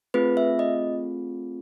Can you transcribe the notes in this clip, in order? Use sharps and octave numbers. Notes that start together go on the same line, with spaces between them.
A3 C4 F4 G#4 B4
E5
D#5